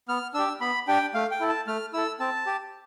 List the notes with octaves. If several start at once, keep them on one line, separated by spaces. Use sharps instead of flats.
B3 F6
D4 G4 E6
B3 B5
D4 G4 G5
A3 F5
G5
E4 A4
A5
A3 F6
E4 A4 E6
C4 A5
G4